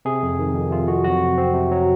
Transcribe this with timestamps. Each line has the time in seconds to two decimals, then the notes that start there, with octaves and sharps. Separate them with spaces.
0.05 C3 G#4
0.23 F2
0.39 D#3
0.55 F2
0.71 C3 F4
0.88 F2 F#4
1.04 F#3 F#4
1.21 C3
1.38 C4
1.54 C3
1.71 F#3